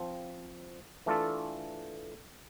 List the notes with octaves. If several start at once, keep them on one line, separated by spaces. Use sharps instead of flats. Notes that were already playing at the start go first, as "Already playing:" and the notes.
Already playing: F3 C4
E3 A3 D4 F4 A4